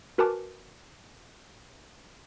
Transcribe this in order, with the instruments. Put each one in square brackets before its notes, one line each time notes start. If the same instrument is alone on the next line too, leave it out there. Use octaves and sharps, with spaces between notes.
[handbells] F#4 A#4 B4 G#5 A5 D6